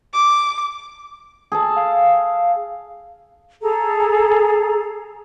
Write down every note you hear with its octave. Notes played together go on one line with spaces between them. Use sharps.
D6
G#4 A4 A5
F5
G#4 A4 A#5